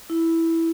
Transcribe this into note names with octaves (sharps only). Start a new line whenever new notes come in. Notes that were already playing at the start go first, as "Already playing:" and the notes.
E4